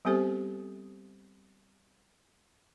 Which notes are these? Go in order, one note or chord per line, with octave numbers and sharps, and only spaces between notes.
G3 B3 C4 G4 A4 C5